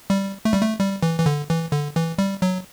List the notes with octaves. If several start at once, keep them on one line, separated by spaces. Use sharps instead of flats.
G3
A3
G3
A3
G3
E3
E3
D3
E3
D3
E3
G3
F#3